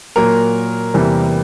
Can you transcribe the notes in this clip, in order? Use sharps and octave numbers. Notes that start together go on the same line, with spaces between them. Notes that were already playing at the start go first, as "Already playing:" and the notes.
A#2 F#3 A#3 A#4
E2 C3 E3 G3 A#3